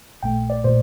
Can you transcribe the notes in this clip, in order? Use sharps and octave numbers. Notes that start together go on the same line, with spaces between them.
A#1 A#2 A3 G5
D5
A#2 A3 C5